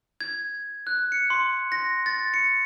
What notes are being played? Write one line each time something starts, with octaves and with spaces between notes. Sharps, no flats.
G#6
F#6
C#7
C6
A#6
A6
C#7